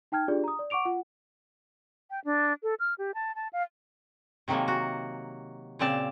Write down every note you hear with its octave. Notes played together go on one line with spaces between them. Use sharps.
D#4 G5 A5 F6 G#6
D4 F4 G4 G#4 D5
A#5 D#6
D5
F#5 C#6 D6 D7 F7
F4 F#5
G5
D4
A4
F6
G4
A5
A5
F5
C3 D#3 F#3 G#3 A#3
F#4
A#2 C#3 C4 D5 A5